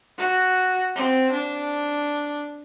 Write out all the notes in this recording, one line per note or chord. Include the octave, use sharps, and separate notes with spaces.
F#4
C4
D4